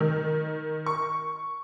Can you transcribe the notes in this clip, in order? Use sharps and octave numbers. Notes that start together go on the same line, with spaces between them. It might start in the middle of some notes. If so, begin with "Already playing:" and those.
D#3
C#6